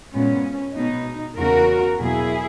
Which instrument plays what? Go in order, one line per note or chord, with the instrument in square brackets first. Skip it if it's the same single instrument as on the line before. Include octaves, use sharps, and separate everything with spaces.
[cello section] A#2 G#3 B3 C#4
B2 G#3 B3 D#4
E2 C#3 E3 A#3 F#4 A#4
E2 B2 F#3 A#3 E4 G#4